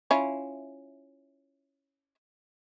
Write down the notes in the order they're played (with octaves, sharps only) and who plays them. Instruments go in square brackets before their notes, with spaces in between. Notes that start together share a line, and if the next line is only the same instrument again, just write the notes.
[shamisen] C#4 E4 F4